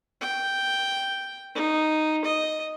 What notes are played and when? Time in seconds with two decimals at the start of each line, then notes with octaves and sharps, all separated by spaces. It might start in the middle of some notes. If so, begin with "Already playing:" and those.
0.21 G5
1.55 D#4
2.25 D#5